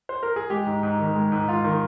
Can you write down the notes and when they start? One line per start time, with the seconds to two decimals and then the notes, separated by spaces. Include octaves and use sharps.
0.09 C5
0.23 A#4
0.36 G#4
0.50 G#3 G4
0.67 G#2
0.83 G#2
0.99 D#3
1.16 G#3
1.32 G#2
1.48 G#2 F4
1.64 D#3